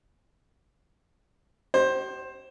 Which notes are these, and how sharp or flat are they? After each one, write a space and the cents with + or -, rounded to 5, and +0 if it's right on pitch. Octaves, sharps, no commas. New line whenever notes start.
G4 -40 C5 +15